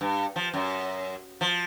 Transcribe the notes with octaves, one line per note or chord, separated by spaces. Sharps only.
G2
F3
F#2
F3